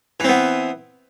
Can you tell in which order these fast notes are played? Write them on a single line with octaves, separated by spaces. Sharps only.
E3 C4 B3